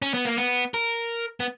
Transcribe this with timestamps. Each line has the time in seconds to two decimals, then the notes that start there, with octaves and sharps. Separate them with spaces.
0.02 C#4
0.14 B3
0.25 A#3
0.37 B3
0.74 A#4
1.40 B3